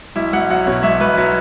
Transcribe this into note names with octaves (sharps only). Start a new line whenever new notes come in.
B1 E4
B1 F#5
F#3 F#5
B2 C#5
B1 E5
B1 B4
F#3